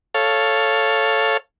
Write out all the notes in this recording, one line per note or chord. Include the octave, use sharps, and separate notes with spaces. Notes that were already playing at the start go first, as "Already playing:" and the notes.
A4 C#5 F5